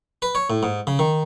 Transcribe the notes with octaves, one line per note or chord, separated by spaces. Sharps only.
B4
C#5
A2
G#2
C#3
D#3